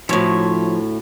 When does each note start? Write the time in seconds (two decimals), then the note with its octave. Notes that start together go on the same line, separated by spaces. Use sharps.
0.09 D2 A2 F3 C#5